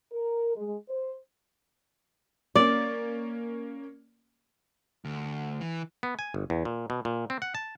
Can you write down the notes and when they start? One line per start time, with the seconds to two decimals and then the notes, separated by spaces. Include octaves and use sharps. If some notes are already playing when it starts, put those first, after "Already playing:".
0.13 A#4
0.56 G#3
0.89 C5
2.56 A#3 C#4 D5
5.05 D2
5.61 E3
6.03 B3
6.19 G#5
6.34 G1
6.50 E2
6.65 A#2
6.90 B2
7.05 A#2
7.30 C4
7.42 F#5
7.55 A5